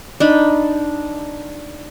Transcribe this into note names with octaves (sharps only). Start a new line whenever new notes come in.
D4 D#4 B5